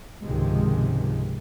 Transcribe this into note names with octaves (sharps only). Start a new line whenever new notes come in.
C#2 G#2 C3 D#3 F3 G#3